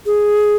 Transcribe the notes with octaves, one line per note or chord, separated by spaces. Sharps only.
G#4